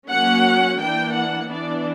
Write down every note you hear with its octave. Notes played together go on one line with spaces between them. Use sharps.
F#3 A#3 C#4 F#5
E3 A#3 D4 G5
F#5
E3 B3 D4 D5